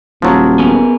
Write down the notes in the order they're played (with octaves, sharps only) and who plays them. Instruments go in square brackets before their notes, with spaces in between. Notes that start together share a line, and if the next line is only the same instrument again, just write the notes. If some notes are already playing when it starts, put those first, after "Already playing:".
[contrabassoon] D#1 [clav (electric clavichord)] F3 F#3
[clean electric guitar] B3 G#4 A#4